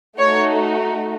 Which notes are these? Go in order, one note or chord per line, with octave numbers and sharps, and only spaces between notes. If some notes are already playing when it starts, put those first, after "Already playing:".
A3 D#4 F#4 C#5